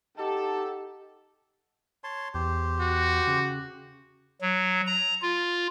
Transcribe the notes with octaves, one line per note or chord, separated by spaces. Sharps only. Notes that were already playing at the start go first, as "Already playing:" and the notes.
D#4 G4 A4 D#5 F#5 A5 D6
C#5 A5 C6
E2 G4 C5
F#4
C#3
F#3
A#5
F4